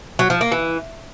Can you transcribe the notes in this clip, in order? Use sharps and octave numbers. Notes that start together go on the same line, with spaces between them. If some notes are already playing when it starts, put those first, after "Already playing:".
F#3
F3
A#3
E3